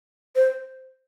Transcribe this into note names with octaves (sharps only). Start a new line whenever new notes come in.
C5